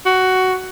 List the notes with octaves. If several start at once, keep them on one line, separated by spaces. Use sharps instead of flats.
F#4